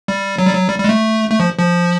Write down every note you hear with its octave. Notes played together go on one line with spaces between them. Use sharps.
G3
F#3
G3
F#3
G3
G3
G#3
A3
A3
F3
F3